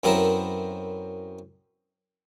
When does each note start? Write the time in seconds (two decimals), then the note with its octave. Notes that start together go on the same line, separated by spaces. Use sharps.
0.04 F#2 B3 C4 E4 A4 A#4